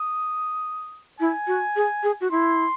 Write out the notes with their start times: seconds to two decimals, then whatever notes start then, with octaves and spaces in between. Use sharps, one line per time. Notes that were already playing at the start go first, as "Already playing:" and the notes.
Already playing: D#6
1.20 E4 G#5
1.47 F#4
1.76 G#4
2.03 G#4
2.21 F#4
2.31 E4 C6